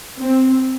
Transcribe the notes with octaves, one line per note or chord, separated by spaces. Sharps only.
C4